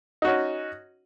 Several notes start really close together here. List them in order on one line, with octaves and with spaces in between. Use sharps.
D#4 F#4 C#4